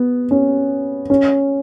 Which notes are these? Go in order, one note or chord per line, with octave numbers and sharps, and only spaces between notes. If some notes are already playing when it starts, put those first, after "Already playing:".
Already playing: B3
C#4
C#4